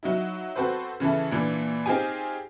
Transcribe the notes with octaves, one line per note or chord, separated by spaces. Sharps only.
F#3 D#4 E4
C4 F#4 A4 B4 C5
C#3 E3 E4 A4
A#2 E3 D4
C4 D#4 F4 G4 G#4 G#5